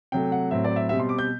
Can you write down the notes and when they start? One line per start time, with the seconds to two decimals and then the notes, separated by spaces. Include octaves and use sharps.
0.12 C3 F#3 A3 G5
0.32 F#5
0.51 A2 F#3 A3 C4 E5
0.64 D5
0.76 E5
0.89 B2 G3 C4 E5
1.00 C6
1.09 D6
1.19 G6